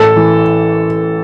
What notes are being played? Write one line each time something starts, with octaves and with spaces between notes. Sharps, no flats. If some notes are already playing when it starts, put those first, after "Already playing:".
Already playing: A1 A4
E3